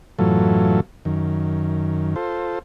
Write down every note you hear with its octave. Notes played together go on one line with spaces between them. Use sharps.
F#2 A2 E3 F#3 F4 A4
F#2 D#3
F4 A4 C5